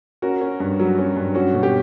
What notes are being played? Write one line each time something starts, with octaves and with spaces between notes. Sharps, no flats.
C#4 F#4 A#4
C#4
G2
F#3
C#4
G2
C#4 F#4
B2
G4